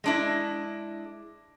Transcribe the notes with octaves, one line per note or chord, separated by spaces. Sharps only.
G#3 D4 E4